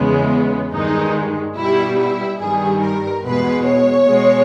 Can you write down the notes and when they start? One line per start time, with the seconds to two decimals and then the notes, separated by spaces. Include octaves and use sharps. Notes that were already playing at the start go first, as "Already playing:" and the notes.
Already playing: E2 C#3 G#3 B3
0.30 B3
0.72 G2 D#3 G#3 D#4
1.55 B2 G3 E4
1.98 E4
2.39 G2 D#3 G3 G#4
2.81 A#4
3.22 E2 B2 G#3 B4
3.65 C#5
4.07 B2 G#3